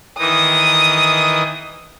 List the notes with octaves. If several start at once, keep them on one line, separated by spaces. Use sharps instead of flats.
D#3 E3 D#4 D#6